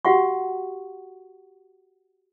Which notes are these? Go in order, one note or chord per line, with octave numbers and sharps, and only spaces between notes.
F#4 G4 F5 F#5 C#6